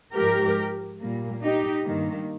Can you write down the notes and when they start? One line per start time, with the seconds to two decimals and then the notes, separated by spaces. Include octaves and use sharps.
0.13 G#2 F3 G#3 G4 A#4
0.99 A#2 G3 A#3
1.42 D#4 G4
1.85 G2 D#3 A#3